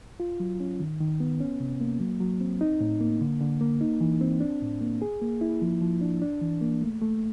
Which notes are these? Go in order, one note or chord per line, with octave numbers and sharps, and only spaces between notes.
F4
F#3
C#4
D#3
D#3
B3
C#4
C3
A#3
F#3
F#3
C4
D#4
A2
A#3
D3
D3
A#3
D#4
E3
C4
D4
A2
A#3
G#4
A#3
E4
F3
F3
D4
D4
E3
A#3
A3
A3